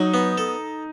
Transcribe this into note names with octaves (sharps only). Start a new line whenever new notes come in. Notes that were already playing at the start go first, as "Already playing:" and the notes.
Already playing: F#3 D#4
B3
A4